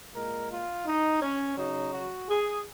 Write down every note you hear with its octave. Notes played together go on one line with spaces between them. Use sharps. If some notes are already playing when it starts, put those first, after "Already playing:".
A#2 G#3 A#4
F4
D#4
C#4
C#3 F#3 D#4
F#4
G#4